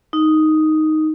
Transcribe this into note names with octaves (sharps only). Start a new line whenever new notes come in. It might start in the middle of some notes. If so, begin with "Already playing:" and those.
D#4